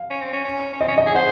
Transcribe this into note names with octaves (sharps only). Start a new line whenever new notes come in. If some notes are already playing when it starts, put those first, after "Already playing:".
Already playing: F5
C#4
C4
C#4
C#4
C#4
C4 D#5
C#4
D#5
G#4
C5 F#5